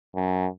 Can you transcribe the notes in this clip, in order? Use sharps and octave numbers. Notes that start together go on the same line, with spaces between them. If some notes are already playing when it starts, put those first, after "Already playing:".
F#2